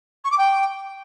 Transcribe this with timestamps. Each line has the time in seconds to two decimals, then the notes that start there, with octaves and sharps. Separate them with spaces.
0.24 C#6
0.31 D6
0.37 G5